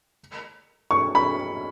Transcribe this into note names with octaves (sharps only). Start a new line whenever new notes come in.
C#6
B5